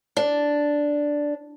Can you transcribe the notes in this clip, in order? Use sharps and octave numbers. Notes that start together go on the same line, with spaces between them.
D4